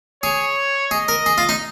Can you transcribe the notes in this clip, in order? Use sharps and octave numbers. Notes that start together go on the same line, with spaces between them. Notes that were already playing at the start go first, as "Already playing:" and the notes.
G#4 C#5
G#4 D#5
A#4
G#4
F4
D#4